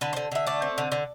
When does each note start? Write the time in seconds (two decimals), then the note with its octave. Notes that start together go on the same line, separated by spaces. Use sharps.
0.01 D3 B4
0.13 D3 C5
0.32 D3 E5
0.47 A3 D5
0.62 C4
0.78 D3
0.92 D3